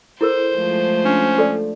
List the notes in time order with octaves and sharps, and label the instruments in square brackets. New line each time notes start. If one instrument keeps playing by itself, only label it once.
[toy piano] E4 A4 A#4 [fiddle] C5
[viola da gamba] F3 G#3 A3
[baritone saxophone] C#4 [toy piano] D4
[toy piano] A4 D5